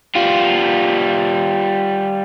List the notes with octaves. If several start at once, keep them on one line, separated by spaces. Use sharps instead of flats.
G3 F4